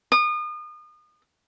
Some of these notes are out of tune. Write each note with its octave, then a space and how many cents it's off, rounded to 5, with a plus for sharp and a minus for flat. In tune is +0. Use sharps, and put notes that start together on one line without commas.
D#6 -35